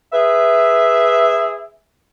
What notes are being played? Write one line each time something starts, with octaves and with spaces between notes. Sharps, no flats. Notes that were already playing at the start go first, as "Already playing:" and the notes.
G#4 B4 E5